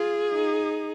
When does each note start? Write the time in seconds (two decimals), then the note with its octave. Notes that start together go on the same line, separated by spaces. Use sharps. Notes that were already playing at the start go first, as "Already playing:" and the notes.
Already playing: F4 G#4
0.33 D#4